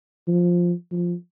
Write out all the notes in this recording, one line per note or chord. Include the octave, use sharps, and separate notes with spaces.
F3
F3